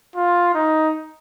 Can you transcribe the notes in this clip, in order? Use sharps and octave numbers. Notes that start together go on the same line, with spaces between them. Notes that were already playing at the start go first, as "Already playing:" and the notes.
F4
D#4